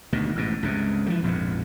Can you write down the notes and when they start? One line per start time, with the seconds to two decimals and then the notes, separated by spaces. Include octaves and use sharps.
0.13 D2 B2 D#3
0.36 A1 G#2 B2
0.63 C#2 G2 C3
1.06 E3 F3 A3
1.22 A#1 F2 G#2 B2